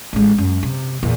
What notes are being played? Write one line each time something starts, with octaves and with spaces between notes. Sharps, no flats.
A1 G#3
F#2
C3
E2 A#2